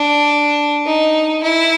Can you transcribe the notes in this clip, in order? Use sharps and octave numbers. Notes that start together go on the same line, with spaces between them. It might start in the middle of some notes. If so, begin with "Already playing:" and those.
Already playing: D4
D#4
E4